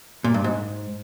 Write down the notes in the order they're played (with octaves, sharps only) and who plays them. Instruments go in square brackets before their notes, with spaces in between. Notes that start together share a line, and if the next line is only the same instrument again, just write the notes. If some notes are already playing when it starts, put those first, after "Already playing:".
[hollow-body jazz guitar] A#2
G2
G#2